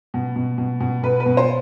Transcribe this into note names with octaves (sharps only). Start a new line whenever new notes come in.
B2
B2
B2
B2
B2 B4
B4
B2
C5